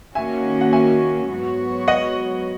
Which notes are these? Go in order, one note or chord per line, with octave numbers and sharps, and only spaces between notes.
D#3 A#3 C#4 F#4 E5 G#5
F#5
E5 G#5
G#2 F#3 B3 F#4 C#5
D#5 F#5